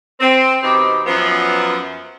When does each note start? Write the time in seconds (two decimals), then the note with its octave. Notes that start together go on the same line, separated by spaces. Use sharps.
0.20 C4
0.63 B2 D#3 C4 D#4 G4
1.07 F#2 F3 B3